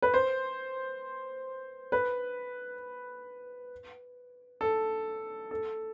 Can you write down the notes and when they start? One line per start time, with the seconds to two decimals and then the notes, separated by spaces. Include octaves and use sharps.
0.02 B4
0.14 C5
1.92 B4
4.61 A4
5.51 A4